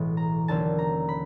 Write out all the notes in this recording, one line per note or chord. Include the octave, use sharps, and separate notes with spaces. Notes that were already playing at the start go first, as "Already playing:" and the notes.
Already playing: B1 A2 E3 G#3 B3
A#5
D#2 D3 F#3 A#3 C#4 A5
A#5
B5